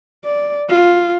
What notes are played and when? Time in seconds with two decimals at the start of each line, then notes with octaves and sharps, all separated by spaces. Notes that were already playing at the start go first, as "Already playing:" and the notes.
0.25 D5
0.69 F4